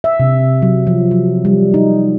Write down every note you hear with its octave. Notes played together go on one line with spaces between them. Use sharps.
E5
C3
F#3
F3
F#3
G3
D#4